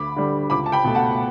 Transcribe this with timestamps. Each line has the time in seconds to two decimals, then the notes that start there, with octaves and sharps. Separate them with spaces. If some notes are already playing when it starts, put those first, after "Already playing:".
Already playing: D2 B5 D6
0.16 D3 G3
0.50 C#2 B5 D6
0.66 A5
0.72 G5 B5
0.85 B2 A3
0.95 F#5 A5